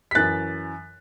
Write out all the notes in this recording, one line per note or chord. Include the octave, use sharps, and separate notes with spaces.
B6
F#2 E3 F#6 A6